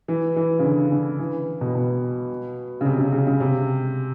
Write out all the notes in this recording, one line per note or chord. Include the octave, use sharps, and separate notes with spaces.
E3
E3
C#3
D3
D3
E3
B2
B2
C#3
C3
C#3
C#3
C#3
C3